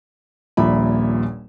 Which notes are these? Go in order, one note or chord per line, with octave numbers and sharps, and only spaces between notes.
D#1 A#1 A#2 E5 B5